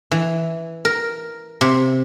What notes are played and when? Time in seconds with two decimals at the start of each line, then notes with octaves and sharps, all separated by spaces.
0.11 E3
0.85 A#4
1.61 C3